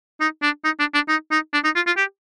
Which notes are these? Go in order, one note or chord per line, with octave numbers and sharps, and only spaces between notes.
D#4
D4
D#4
D4
D4
D#4
D#4
D4
D#4
F4
F4
G4